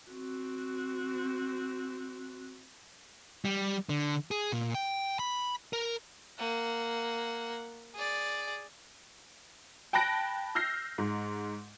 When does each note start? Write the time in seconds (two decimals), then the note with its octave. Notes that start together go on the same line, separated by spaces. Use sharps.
0.11 C4 F#4
3.45 G3
3.89 D3
4.31 G#4
4.52 A#2
4.74 G5
5.19 B5
5.73 A#4
6.39 A#3 F#5
7.95 G#4 D5
9.93 G5 A5 B5 F#6 A#6 D7
10.55 E6 F6 G6 A#6 C7
10.98 G#2